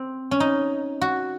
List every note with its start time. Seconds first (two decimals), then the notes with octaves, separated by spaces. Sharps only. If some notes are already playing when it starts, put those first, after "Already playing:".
Already playing: C4
0.31 C#4
0.40 D#4
1.01 F#4